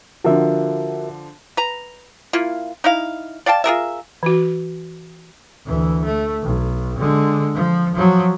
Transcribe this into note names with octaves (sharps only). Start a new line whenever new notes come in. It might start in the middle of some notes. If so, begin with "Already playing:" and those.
D3 F3 F#4 A#4 E5
B4 A#5
A#3 E4 F4
D#4 E4 F5
D5 F5 G5 A5
F4 G#4 A#4 E5
E3 F#4
D2 E3
A3
B1
D3 G#3
F3
F3 F#3